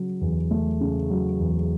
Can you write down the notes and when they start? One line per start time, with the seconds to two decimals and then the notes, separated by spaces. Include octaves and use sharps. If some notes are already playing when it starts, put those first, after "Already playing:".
Already playing: C#3 F#3
0.21 E2
0.51 A3
0.81 C#3
1.10 F#3
1.39 E2